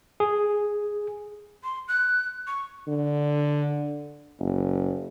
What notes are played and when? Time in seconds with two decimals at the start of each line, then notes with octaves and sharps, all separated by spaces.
0.20 G#4
1.63 C6
1.88 F#6
2.47 C#6
2.88 D3
4.40 F#1